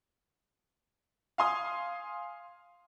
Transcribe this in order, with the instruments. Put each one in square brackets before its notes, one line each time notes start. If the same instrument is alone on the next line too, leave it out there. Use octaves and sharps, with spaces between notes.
[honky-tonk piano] F5 G#5 C6 D#6